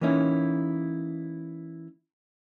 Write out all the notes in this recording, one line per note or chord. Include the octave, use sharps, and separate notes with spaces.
E3 A#3 C#4 D#4 E4